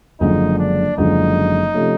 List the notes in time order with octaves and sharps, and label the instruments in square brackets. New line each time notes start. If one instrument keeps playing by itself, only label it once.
[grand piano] F#1 F#2 D3 F3 G#3 [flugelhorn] D#4
[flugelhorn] D4
[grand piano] F#1 F#2 D3 F3 G#3 [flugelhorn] D#4
[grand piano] C3 F3 A3 C#4